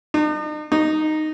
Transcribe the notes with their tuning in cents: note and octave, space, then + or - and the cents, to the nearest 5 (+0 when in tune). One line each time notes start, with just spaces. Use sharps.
D#4 -45
D#4 -10